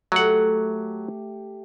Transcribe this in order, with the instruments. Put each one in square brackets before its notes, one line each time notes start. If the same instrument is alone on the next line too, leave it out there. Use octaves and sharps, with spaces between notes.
[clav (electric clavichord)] F#3 F#5 [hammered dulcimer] A3 G4